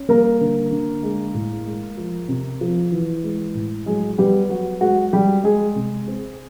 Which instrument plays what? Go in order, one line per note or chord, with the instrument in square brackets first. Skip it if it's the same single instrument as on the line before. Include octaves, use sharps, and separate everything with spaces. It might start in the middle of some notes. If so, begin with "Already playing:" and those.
Already playing: [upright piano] C#4
G3 A#3 A#4
D3
D3
G#3
A2
G#3
F3
C3
F3
E3
G#3
A2
F#3 G#3 G#4
G3 B3 G4
F#3 F#4
G#3 F#4
G3 G#3 G4
G#3 G#4
C3
C4